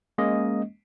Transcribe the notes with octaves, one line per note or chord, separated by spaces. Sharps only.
G#3 A#3 C#4 D#5